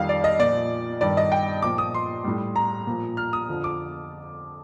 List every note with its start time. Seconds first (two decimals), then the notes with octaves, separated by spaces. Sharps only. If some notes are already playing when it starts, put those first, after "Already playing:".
Already playing: F2 D#3 G3 F5
0.09 D5
0.24 D#5
0.39 A#2 F3 D5
1.01 G2 D#3 G3 D5
1.17 D#5
1.32 G5
1.62 A#2 F3 D6
1.78 D#6
1.94 C6
2.24 A2 G3
2.56 A#5
2.87 A#2 F3
3.17 F6
3.33 D#6
3.49 F2 D3 F3
3.64 D6